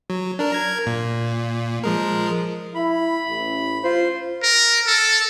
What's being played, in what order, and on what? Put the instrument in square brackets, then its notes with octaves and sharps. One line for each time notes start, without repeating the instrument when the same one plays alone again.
[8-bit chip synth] F#3
D4 A#4
A#4 A#5 G#6
A#2
F3 G#3 A#4
[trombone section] E4 [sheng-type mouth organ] B5
[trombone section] A1
[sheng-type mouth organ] F4 C5
[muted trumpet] A#4
A4